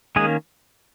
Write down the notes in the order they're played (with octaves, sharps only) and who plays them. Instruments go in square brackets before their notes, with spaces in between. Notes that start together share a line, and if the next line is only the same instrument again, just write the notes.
[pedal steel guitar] D#3 G#3 A#3 C#4 G#4